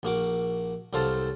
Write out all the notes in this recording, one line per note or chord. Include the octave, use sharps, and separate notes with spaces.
A#1 A#3 F#4 D6
C2 F#3 A4 C5 F5 A5